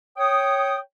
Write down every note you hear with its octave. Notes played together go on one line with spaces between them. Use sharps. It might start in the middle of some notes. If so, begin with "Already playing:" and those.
C#5 G5 D#6